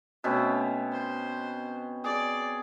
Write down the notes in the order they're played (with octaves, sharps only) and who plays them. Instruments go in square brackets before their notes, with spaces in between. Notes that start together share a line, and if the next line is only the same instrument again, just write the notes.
[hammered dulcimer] B2 C4 C#4 [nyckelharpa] A3
[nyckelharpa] C5
[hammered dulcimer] G#4 [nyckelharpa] D5